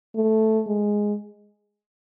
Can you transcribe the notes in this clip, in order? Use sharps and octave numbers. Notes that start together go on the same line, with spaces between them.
A3
G#3